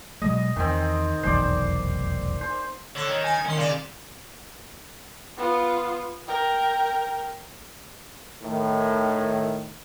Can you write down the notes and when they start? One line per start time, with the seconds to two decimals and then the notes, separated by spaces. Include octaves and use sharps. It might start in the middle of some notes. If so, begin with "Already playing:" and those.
0.22 B2 F#3 G#3 D#5
0.56 E2 D#3 C4
1.23 F1 B1 E2 C5 D5
2.41 C5
2.96 D3 C#5
3.08 D#3
3.24 G#5
3.45 D#3 C#4 C6
3.58 C#3 D5 F5
5.38 B3 F4
6.27 A#4 G5
8.42 A2 D#3